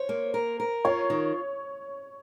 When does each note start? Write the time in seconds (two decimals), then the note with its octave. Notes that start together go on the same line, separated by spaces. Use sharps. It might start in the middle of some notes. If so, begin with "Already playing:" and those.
Already playing: C5 C#5
0.09 A#3
0.34 A#4
0.60 A#4
0.85 F4 C#5
1.10 D#3